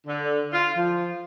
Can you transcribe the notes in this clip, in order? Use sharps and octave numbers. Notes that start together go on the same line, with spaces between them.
D3
F4
F3